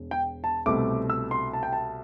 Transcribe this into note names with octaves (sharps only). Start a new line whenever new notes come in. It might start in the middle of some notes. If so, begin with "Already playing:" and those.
Already playing: E1
G5
A5
C2 B2 A3 C4 D6
E6
C6
A5
G5
A5